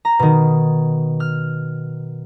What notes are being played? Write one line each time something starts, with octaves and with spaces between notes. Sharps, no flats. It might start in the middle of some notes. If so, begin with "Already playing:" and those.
A#5
B2 D#3
F6